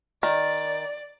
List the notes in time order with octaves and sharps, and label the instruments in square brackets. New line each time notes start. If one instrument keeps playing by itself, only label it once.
[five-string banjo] D#3 [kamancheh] D5